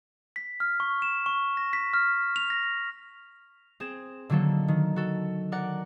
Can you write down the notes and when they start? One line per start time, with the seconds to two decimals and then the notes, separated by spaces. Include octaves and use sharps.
0.36 B6
0.60 F6
0.80 C#6
1.02 E7
1.26 C#6
1.57 A#6
1.73 B6
1.94 F6
2.36 F7
2.50 A#6
3.80 C4 G#4 E7
4.29 D3 D#3 F#3 A#3 A4
4.68 D#3
4.96 F#4 A4
5.52 A#4 D5 F#5